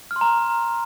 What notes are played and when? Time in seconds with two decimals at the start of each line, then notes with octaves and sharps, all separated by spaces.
0.11 F6
0.16 C6
0.21 A#5